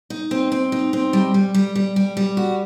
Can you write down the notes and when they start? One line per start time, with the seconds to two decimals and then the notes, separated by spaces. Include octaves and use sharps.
0.10 D#4
0.31 C4
0.52 C4
0.72 D#4
0.93 C4
1.13 G3
1.34 G3
1.54 G3
1.76 G3
1.96 G3
2.17 G3
2.37 F#4